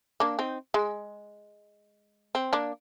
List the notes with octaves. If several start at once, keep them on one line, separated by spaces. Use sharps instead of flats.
A#3 D4
C4 D#4
G#3
C4
A#3 D4